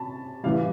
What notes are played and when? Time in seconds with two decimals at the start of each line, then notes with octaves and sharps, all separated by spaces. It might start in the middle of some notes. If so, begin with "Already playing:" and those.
Already playing: C3 A5 B5
0.43 A2 E3 G3 F5